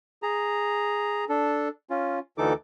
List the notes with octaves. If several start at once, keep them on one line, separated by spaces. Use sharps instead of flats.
G#4 A#5
D4 A4
C#4 F4
D2 D3 E3 D#4 A4 D6